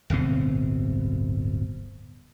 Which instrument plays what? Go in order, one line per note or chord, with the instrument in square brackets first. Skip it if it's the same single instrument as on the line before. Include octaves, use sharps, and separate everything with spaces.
[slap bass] D1 G1 B2 C4